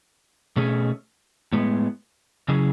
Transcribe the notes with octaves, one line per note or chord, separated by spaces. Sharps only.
B2 A3 C#4 G#4
A2 G#3 B3
C#3 F#3 C#4 E4 G#4